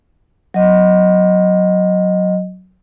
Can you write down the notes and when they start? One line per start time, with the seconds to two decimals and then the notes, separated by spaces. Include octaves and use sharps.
0.54 F#3 D#5